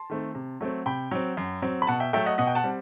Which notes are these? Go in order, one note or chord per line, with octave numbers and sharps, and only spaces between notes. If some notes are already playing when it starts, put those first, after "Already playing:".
Already playing: A5 C6
D#3 A3 C4
C3
F#3 A3 C4
C3 G5 B5
F#3 C4
F#2
F#3 C4
B5
B2 F#5 A5
E5 G5
F#3 A3 E5 G5
D#5 F#5
B2 D#5 F#5
G5
F#5 A5
G3 C4